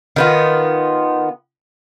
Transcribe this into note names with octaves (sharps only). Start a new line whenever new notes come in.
D#3 B3 F4